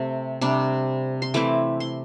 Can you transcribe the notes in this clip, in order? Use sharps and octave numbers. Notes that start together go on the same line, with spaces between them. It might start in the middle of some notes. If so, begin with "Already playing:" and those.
Already playing: C3 A3 C4
C3 G3 D4
C6
E3 A3 C4 E4 D6
C6